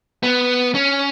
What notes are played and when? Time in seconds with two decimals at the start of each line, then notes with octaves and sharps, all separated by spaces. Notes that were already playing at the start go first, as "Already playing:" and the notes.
0.23 B3
0.75 C#4